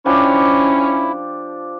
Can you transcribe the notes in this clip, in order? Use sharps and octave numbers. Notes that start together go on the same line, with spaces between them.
F3 C#4 D4 E4 G4